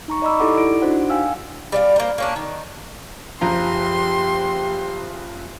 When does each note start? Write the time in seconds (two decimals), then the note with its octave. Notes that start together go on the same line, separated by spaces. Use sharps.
0.08 D#4 A#5 C#6
0.22 D5 D#5 A#5 B5 D6 E6
0.40 D#4 E4 G4 A4 F#5 D6
0.57 E4 D5 D7
0.82 D4 D#4 F#4 C5 F#5
1.10 F5 G5 G#5 E6 F6
1.72 G3 D5 F5
1.96 A#3 C5
2.18 A#3 C#4 D4
2.36 D#3
3.41 F#1 F3 G4 A#5 C6